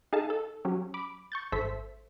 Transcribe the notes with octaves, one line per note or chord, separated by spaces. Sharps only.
D#4 G#4 A4 F5 A5
A4
F#3 C#4 G4
B5 D6
C#6 G6 A6
G#1 A4 C5 E5 B6